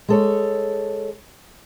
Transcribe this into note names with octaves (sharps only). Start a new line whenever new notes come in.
G#3 A4 C#5